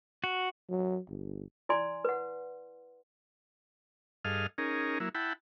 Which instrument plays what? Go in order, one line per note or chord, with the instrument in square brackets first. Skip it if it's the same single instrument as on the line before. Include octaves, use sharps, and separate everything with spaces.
[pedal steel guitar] F#4
[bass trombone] F#3
G1
[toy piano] E4 D5 G#5 C6
B4 F#5
[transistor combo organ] G2 G#4 A4 D#5 F5 F6
C#4 D#4 G#4 A#4
F#3 A#3 E4
E4 F#5 G5 A5 B5